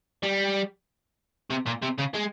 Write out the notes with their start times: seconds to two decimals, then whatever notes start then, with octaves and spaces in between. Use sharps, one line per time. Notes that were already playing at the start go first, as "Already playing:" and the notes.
0.23 G3
1.50 C3
1.66 A#2
1.82 C3
1.98 C#3
2.14 G#3